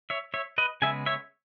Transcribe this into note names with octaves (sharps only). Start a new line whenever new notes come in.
C#5 E5
C#5 E5
B4 D#5
C#3 G#3 B3 E5 G#5
C#5 E5